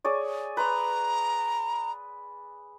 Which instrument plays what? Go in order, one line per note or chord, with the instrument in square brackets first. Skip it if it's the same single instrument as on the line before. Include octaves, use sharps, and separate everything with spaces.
[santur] G#4 C#5 D5
[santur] B4 C6 [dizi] A#5